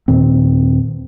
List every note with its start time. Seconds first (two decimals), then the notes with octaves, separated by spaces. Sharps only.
0.08 D#2 A#2 D#3 C4